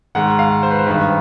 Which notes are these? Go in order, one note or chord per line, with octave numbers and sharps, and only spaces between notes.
G#2 D#3 F#5
F5
C5
B4
C5
G2 D#3 B4